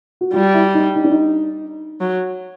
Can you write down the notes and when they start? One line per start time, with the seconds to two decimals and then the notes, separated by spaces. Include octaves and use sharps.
0.21 F#4
0.33 G3 F4
0.54 E4
0.75 D#4
0.95 D#4
1.04 D4
1.11 D#4
2.01 F#3